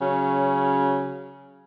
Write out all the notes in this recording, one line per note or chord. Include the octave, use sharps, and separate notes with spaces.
C#3 F#3 C#4